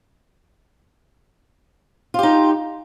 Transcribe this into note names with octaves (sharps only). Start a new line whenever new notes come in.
D#4 F4 G4